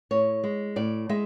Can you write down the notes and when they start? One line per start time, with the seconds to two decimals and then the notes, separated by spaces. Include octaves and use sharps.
0.11 A2 C#5
0.44 G#3
0.76 A2 D5
1.09 G#3 E5